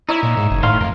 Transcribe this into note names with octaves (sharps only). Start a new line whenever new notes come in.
D#4 E4 C#5 E5
A#2
G#2
F#1
A2 D#3 F5 C6
F2 F4 A#4